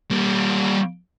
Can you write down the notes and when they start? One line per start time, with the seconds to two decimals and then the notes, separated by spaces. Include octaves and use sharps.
0.11 G3 A#3